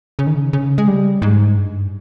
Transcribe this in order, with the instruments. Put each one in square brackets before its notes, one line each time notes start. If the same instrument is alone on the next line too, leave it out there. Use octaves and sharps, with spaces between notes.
[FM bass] C#3
D#3
C#3
C#3
G#3
G3
G#2
G2